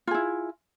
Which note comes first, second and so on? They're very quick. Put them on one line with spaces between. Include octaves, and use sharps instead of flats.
F4 G#4 E4